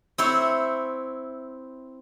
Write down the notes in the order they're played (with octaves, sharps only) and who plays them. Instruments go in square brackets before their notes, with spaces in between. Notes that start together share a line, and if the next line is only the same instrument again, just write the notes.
[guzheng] C4 E4 C5 C#5